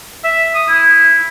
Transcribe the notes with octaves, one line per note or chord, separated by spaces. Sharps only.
E5
D#6
E4